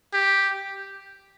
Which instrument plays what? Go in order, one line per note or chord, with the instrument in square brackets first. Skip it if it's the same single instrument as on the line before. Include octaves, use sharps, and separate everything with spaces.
[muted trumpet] G4